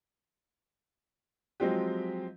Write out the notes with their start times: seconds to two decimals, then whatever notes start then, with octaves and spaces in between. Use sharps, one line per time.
1.60 F3 F#3 G#3 C4 F4 G4